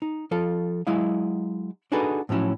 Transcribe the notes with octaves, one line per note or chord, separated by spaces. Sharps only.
D#4
F3 F4 A4
F#3 G#3 E4 D#5 F5
D4 D#4 F#4 G#4 A4 B4
A2 F3 F#3 C#4 E4